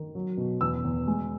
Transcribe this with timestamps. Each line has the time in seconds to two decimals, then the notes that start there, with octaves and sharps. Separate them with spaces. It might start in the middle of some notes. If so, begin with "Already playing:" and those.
Already playing: D#3
0.15 F#3
0.37 B2
0.61 E2 E6
0.84 E2
1.07 G#3